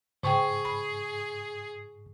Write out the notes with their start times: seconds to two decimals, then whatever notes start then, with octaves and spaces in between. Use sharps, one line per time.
0.23 G#2 C#3 G#4 G5 C#6
0.65 B5